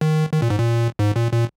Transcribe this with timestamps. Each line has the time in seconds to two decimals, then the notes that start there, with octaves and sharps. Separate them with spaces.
0.01 D#3
0.33 D#3
0.42 A#2
0.50 G#2
0.59 A#2
0.99 G#2
1.16 A#2
1.33 A#2